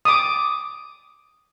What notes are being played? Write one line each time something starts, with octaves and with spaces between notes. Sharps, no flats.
D6 D#6